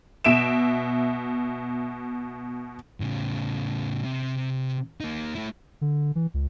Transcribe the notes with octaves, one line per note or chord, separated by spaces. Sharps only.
B2 E5 D7 E7
A2 C#3
C3
A#3 D#4
A3 E4
D3
E3
C#2